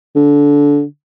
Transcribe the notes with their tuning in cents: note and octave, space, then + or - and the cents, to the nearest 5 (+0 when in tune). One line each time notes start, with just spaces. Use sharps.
D3 -20